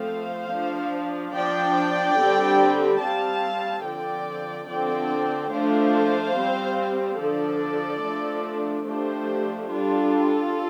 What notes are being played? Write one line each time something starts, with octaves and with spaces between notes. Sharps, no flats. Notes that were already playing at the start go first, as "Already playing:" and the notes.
Already playing: F3 A3 C4 C5 F5
F3 D4
F3 D4 D5 G5
D3 G3 C4
G3 C4 F5 A5
D3 F3 C4 D5 G5
D3 F3 C4 D5 G5
F3 A3 D4 C5 F5
G3 C4
D3 F3 D4 A4 D5
F3 A3 D4
F3 A3 D4 G4 C5
G3 D4 F4 A4